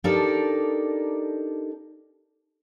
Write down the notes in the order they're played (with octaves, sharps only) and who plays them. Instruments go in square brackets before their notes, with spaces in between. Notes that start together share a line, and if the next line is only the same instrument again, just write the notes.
[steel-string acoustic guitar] D4 D#4 G4 A4 A#4 D5